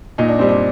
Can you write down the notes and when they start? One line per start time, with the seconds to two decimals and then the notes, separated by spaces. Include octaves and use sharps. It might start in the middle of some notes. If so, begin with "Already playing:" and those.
0.18 A#2 D#4
0.28 D4
0.39 G3 C4
0.49 D4